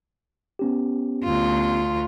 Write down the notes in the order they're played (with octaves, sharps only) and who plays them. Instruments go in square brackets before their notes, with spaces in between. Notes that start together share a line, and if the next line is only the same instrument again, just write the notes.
[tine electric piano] B3 C#4 G4
[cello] D2 F4